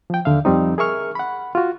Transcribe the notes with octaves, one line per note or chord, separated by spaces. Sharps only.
F3 G5
D#2 D3 E5 F5
F2 F3 G3 C4 D#4
G#4 A#4 E5 C#6 F6
F#5 B5
F4 F#4